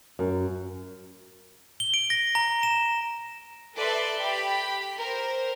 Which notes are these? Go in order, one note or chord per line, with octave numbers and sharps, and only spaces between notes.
F#2
G7
D7
A#6
A#5
E7
A4 B4 D5 E5 C6
G4 B5
A#4 C5